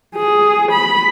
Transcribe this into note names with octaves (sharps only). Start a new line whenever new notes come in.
G#4
B5